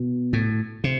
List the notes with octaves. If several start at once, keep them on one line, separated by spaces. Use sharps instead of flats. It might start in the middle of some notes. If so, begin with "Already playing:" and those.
Already playing: B2
A2
C3